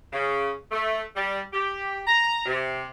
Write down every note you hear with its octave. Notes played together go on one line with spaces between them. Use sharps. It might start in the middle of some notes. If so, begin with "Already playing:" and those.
C#3
A3
G3
G4
A#5
C3